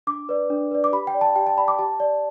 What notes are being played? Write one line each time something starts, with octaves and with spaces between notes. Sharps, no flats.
D4 D6
B4 D5
D4
B4 D5
D6
G4 B5
G5
D5
A5
G4 G5
A5
D5 B5
D6
G4 A5
D5